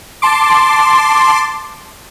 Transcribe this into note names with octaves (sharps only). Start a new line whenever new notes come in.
A5 C6 D6